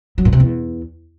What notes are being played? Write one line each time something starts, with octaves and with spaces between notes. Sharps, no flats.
F#3
A#2
C3
E2